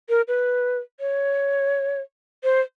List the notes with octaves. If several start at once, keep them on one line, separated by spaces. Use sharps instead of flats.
A#4
B4
C#5
C5